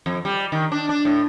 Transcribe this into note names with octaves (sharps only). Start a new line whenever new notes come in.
F2
G3
D#3
D4
D4
A2